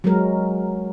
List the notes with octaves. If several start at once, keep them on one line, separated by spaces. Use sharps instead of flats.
F#3 G#3 A#4